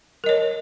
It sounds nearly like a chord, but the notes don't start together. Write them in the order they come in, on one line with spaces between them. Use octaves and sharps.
A#4 D#5 C#5